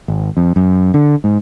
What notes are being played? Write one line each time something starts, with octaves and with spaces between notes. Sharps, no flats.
G#1
F2
F#2
D3
G#2